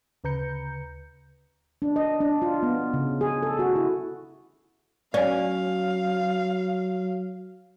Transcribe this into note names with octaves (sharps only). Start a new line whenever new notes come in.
D2 C#3 B4 A#5 G6 C#7
D4
D#5
D4
F4
B3
C#3
G#4
A4
F#4
E4
F#3 C#4 D5 F5 G#5